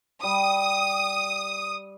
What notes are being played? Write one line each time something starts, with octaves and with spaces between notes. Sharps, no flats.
G3 D#6